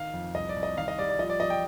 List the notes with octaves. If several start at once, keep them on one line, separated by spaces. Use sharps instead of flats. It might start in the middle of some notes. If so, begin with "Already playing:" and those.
Already playing: D#3 F5
F2
C2 D#5
D5
C2
D#5
D#3 F5
D#5
G3 D5
D5
F3 D#5
D5
F3 D#5
G5